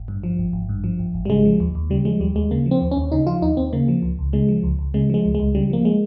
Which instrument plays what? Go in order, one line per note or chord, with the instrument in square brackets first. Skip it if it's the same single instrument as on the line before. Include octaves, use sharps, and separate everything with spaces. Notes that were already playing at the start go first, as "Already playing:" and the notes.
Already playing: [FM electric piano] G#1
G2
F3
G#1
G#1
G2
F3
G#1
G#1
G3
C#3 G#3
F3
D#2
D#2
C#3 G3
F3 G#3
D#2 G3
D#2 G#3
C#3 A#3
F3
C4
D#2
C#4
D#2
C#3 D#4
F3 F4
D#2 D#4
D#2 C4
C#3 A#3
F3
C#2
C#2
C#3 G#3
F3
C#2
C#2
C#3 G#3
F3 G#3
C#2
G#3
C#2
C#3 G3
F3 A#3
G#3